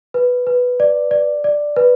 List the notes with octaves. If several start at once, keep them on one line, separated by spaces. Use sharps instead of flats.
B4
B4
D5
D5
D5
B4